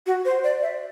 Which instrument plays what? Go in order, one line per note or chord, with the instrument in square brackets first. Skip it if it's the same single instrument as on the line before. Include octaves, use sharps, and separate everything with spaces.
[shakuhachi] F#4
C5
D5
E5